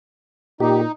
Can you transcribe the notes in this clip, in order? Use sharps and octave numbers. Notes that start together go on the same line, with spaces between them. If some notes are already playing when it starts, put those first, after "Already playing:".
A#2 D#4 G4